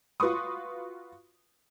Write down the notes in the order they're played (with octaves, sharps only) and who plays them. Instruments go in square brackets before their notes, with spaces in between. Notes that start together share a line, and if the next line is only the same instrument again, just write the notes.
[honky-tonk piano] F4 F#4 B4 C6 C#6 D#6